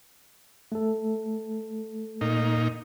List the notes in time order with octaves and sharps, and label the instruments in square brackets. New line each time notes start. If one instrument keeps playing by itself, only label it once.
[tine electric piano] A3 A4
[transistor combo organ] A#2 D#4